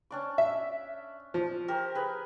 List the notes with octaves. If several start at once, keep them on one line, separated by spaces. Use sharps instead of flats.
C#4 D4 D6
E5
F3
G4 A#4 C5
G#4 B4